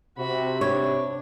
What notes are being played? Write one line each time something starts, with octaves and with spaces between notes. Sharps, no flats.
C3 F#4 B5
D4 C#5